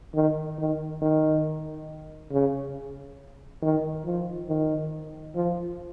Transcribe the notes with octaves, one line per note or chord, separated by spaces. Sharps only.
D#3
D#3
D#3
C#3
D#3
F3
D#3
F3